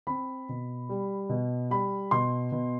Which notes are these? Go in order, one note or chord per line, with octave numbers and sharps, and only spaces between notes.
C4 B5
B2
G3
B2
G3 B5
B2 C6
B2